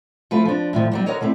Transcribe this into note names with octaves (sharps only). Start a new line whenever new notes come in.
F3 A3 E4 B4
F3 D4
A2 D#3 F3
F#3 G3 A#3
D3 F#4 A#4 C#5 D#5
D3 A3 C4 E4